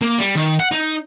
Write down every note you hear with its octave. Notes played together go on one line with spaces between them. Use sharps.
A#3
G3
D#3
F#5
D#4